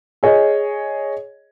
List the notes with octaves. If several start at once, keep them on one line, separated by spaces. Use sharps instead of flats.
G#4 C#5 D#5